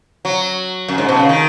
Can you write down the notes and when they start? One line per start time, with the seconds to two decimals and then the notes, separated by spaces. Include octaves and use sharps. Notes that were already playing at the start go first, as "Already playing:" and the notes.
0.25 F#3
0.89 F#2
0.98 G#2
1.08 B2
1.19 C#3
1.29 D#3